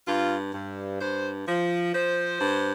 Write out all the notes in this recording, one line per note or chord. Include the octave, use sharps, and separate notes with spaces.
G2 F4
G2
G2 C5
F3
F3 C5
G2